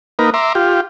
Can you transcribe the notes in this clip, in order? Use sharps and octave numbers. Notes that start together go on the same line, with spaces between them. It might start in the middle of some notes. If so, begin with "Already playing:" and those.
A#3 D#4 A#4 B4
E5 A#5 C6 D6
F4 G4